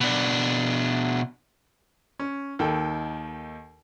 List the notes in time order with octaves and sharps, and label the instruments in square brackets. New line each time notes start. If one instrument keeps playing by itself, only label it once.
[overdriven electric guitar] B2 D4
[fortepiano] C#4
D#2 D#3 A4 G5